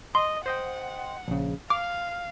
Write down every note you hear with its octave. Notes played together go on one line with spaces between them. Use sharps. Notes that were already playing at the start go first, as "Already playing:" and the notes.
D#5 C6
C5 D#5 F#5 G5
A#1 C#3
F5 D6 F6